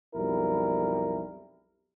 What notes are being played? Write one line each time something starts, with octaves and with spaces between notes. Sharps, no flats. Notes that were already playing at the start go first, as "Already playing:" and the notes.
B1 F2 G3 E4 A#4